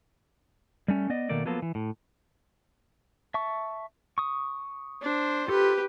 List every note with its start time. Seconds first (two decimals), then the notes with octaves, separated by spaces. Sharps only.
0.88 G3 A3 C#4
1.10 B3 D5 D#5
1.29 B2 D#3 A3 A#3 D5
1.45 F3 F#3 A#3 B3 F4 A4
1.62 E3
1.75 A2
3.34 E5 A5 C#6
4.18 C#6 D#6
5.02 D4 C5
5.48 F4 G4 A4 B4 C6